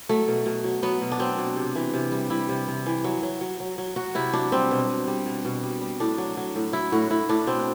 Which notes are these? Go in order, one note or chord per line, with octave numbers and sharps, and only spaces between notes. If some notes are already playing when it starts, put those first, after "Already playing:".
F#3 A3
B2
B2
F#3
F#3 B3
B2
D4
F#3 C4
B2
C3
E3
C3
G3
G3 E4
C3
C3
E3
F#3
F#3
F#3
F#3
F#3
F#3 F#4
C3 E4
F#3 D4
G3 C4
B2
B2
G3
B2
B2
G3
G3
A2 D4
F#3
F#3
A2
F#3 E4
A2 F#4
A2 E4
A2 D4
B2 C4